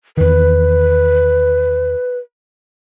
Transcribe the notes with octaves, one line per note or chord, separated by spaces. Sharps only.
E2 D#3 B4